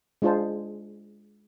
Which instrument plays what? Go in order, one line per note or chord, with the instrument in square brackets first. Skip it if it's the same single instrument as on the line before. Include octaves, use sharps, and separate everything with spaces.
[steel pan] G#3 D4 F4 G#4 C5 A5